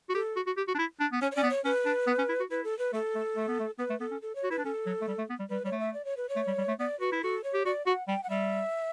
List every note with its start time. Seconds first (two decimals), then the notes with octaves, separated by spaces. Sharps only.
0.10 F#4
0.14 G4 A4
0.36 F#4
0.46 F#4
0.57 G4
0.68 F#4
0.75 D4
0.79 E4
1.00 D4
1.12 B3
1.21 C#4 C#5
1.32 C#5
1.35 C#4 D5
1.43 B3
1.50 C#5
1.65 C#4 B4
1.86 D4
2.07 B3
2.18 C#4
2.29 E4
2.40 F#4
2.50 E4 B4
2.64 A4
2.79 B4
2.93 A3 A4
3.15 A3
3.36 A3
3.48 B3
3.59 A3
3.78 B3 B4
3.90 A3
4.00 B3 A4
4.11 C#4
4.22 A4
4.35 C#5
4.43 F#4
4.51 E4 B4
4.58 D4
4.65 C#4 A4
4.86 F#3
5.01 A3
5.07 G3
5.18 A3
5.30 B3
5.39 G3
5.50 G3 B4
5.64 G3 C#5
5.72 A3
5.80 E5
5.94 D5
6.05 C#5
6.17 B4
6.29 C#5
6.36 A3
6.47 G3
6.58 G3
6.68 A3
6.79 B3 D5
7.00 F#4 B4
7.12 E4
7.22 F#4 A4
7.44 C#5
7.54 G4
7.65 F#4 D5
7.86 F#4 F#5
8.07 G3 G5
8.23 F#5
8.29 G3 E5